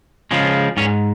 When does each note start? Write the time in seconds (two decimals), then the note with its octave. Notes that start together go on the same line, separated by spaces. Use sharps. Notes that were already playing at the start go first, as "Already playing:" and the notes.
0.31 C#3 F3 G#3
0.77 G#2 C#4